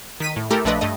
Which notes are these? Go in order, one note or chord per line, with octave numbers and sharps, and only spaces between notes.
D#3 B6 D#7
A2
A3 E4 G4 A4 A#4
A#1 F3 A3 D4 B4 D#5
G2 A3 D#5